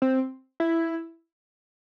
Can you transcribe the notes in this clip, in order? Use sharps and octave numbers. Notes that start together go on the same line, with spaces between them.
C4
E4